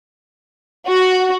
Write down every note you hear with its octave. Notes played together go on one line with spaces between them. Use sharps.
F#4